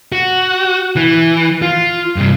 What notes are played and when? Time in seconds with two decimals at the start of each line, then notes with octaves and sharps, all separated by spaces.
0.12 F#4
0.96 E3
1.62 F4
2.16 G2 C3